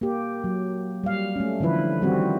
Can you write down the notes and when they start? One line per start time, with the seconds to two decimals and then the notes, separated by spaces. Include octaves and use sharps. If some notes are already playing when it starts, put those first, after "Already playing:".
0.01 A#3 G4
0.44 F#3
1.04 G3 F5
1.36 A3 C#4
1.60 D3 E3 F3 E4 B4
2.01 D#3 G3 C4 F#4